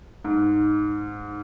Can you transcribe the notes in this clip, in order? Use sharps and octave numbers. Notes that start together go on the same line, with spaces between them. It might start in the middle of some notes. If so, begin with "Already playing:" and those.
G#2